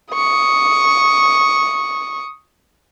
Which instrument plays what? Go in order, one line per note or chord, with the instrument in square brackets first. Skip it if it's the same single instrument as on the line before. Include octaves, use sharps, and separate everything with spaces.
[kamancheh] C#6 D#6